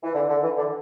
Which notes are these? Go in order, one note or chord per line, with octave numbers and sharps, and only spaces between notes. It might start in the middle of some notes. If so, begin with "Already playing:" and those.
E3
D3
D3
E3
D3